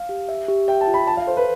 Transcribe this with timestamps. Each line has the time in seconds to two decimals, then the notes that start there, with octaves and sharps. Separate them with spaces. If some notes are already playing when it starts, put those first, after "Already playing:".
Already playing: F5
0.09 G4
0.29 E5
0.48 G4
0.68 E5 G5
0.81 A5
0.87 F4
0.94 B5
1.07 E5 A5
1.17 F5
1.27 A4 C5
1.37 B4